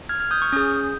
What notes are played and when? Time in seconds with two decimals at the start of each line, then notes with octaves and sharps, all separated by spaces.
0.09 F6 G#6
0.20 F6 G#6
0.31 D#6 G6
0.41 C#6 F6
0.52 C#4 G#4 D#6 G6